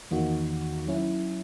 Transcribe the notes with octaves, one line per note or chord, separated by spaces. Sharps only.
E2 D#3 A#3 D#4 F#4
F#3 C#4 E4